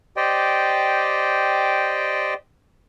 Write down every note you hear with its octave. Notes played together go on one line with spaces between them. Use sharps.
G4 C5 D5 D#5 G5